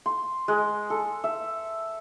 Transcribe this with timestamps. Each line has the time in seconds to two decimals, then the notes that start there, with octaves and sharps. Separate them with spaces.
0.06 C6
0.48 G#3
0.90 A4
1.24 E5